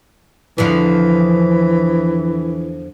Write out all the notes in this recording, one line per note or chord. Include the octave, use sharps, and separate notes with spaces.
E2 D3 E3 F3